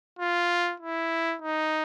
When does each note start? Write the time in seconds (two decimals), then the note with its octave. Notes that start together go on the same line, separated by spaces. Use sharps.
0.19 F4
0.80 E4
1.42 D#4